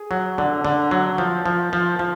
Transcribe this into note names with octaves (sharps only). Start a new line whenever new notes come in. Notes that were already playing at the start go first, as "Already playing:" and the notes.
Already playing: G#4
F#3
D3
D3
F#3
F3
F3
F3
F3